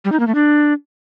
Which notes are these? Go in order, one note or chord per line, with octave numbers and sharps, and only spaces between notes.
G3
D#4
A#3
A3
D4